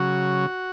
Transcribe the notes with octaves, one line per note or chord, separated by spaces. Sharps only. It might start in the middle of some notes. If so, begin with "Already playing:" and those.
Already playing: C#3 F#3 F#4